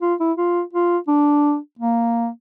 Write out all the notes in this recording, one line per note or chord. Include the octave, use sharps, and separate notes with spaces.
F4
E4
F4
F4
D4
A#3